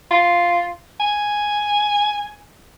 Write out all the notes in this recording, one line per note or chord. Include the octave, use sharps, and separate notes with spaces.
F4
G#5